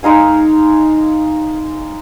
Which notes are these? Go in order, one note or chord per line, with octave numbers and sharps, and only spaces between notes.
G#3 D#4 F5 G#5